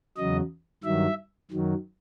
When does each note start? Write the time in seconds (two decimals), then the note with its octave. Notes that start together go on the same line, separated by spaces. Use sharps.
0.17 E2 C#3 F#3 D#5
0.84 G2 D#3 F#3 E5
1.51 F#2 D#3 F#3